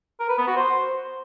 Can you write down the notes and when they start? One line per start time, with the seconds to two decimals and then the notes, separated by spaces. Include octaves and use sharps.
0.20 A#4
0.29 B4
0.38 B3
0.47 F#4
0.56 C5